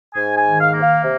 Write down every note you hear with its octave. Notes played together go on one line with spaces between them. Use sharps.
G#2 G#5
G#5
D#3
F5
A#3
F5
C3